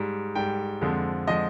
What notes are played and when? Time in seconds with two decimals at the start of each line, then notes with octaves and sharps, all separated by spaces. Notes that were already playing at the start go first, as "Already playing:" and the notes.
Already playing: G#2 G3
0.35 G#2 G3 G5
0.81 F2 D3 F3 G#3
1.27 D3 F3 G#3 D#5